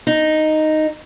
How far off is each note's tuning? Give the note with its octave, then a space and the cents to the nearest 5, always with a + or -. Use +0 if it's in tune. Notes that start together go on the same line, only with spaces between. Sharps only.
D#4 -5